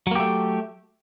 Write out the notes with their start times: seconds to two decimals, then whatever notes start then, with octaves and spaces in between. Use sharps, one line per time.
0.07 F#3
0.11 A#3
0.16 G4
0.20 A3